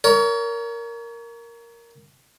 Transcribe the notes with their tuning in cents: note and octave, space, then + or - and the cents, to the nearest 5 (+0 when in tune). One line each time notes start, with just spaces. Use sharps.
A#4 +0 C#5 +35